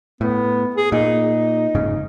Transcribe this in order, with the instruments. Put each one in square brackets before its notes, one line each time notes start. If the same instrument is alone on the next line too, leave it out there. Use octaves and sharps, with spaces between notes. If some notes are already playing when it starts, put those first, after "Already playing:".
[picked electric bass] A2 [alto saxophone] B3
[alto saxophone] G#4
[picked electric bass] A#2 [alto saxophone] D#4
[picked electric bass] F1 G#2 C#3